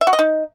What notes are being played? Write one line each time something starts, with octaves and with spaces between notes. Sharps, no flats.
E5
F#4
D#5
D#4